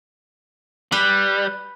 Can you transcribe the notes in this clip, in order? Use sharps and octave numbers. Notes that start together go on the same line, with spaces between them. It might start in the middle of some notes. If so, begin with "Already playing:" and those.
G3 B4